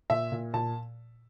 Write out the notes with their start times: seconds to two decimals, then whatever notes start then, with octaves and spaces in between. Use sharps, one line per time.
0.10 A#2 E5
0.32 A#2
0.53 A#2 A5